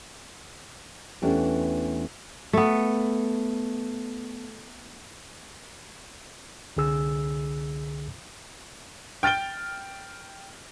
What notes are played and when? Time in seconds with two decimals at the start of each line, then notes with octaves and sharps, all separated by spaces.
1.22 E2 E3 A3 C#4 D4 G4
2.53 A3 B3
6.77 C2 D3 G#4 E6
9.23 G5 F6 A6 D7 G7